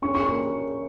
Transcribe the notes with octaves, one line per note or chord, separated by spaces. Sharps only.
C#4 C#6
C#6
A#3 C#6